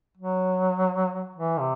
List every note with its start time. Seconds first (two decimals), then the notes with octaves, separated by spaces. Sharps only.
0.17 F#3
1.36 E3
1.59 C3